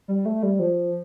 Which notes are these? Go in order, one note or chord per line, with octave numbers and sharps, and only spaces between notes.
G3
A3
G3
F3